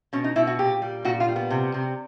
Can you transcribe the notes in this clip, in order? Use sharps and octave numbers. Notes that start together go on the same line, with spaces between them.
B2 C#4
D#4
B2 E4
F#4
A#2 G4
G3
A#2 F#4
F4
G3
B3
C3
C3